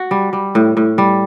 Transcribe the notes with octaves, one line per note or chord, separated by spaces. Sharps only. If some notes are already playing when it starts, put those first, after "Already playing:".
Already playing: F#4
G3
G3
A2
A2
G3